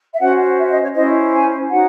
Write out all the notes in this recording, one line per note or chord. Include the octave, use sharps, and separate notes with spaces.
E5
C#4 F#4 C5 F#5
E5
D#5
C#5
C#4 E4 C5 D#5
G#5
D#4 F#4 C#5 F#5